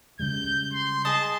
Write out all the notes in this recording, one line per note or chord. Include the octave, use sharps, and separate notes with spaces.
C#3 G3 G#3 G6
C6
G#4 D#5 A5